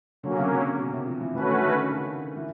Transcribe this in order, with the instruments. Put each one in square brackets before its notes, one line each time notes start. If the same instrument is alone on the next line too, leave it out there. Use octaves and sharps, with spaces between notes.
[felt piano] D3 [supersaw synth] F#3 A#3 C#4
[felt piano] C#3
C3
C#3
B2
C3
F3
E3
[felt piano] D#3 [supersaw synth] A3 C#4 F#4 B4
[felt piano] D3
D#3
D3
C#3
E3